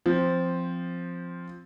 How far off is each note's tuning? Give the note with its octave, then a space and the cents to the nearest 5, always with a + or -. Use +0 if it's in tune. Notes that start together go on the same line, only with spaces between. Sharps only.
F3 +0 C4 +0